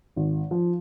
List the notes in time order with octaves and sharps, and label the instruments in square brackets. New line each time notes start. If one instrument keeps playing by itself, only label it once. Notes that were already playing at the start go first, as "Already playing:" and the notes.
[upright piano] G#1
F3